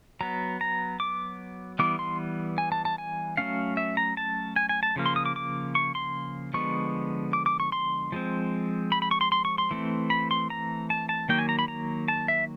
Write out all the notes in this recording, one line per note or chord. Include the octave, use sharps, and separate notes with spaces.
F#3 B3 A#5
A#5
D6
E3 G3 B3 D6
C6
G#5
A5
A5
G#5
F#3 A3 C#4 F5
E5
A#5
A5
G#5
G#5
A5
C#3 F3 A#3
C6
D#6
D6
D6
C#6
C6
D3 F3 G#3 B3 C#6
D6
D6
C#6
C6
F3 G#3 C4
B5
B5
C#6
C6
C6
C#6
C6
E3 A3 C4
B5
C6
A#5
A5
A5
D#3 F#3 A#3 G5
G#5
A#5
B5
A#5
A5
E5